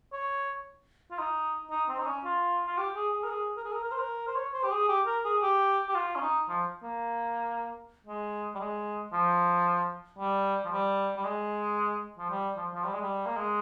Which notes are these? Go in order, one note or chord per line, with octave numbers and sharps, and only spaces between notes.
C#5
F4
D#4
D#4
C4
D#4
C#4
F4
F4
G4
G#4
G#4
A#4
G#4
A#4
G#4
A#4
A#4
C5
A#4
C5
C#5
C5
G4
G#4
G4
A#4
G#4
G4
G4
F4
C#4
D#4
F3
A#3
G#3
G3
G#3
F3
G3
F3
G3
G3
G#3
F3
G3
F3
F3
G3
G#3
G3
A#3
G#3